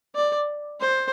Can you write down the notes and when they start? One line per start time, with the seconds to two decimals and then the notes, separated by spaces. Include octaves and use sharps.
0.15 D5
0.80 C5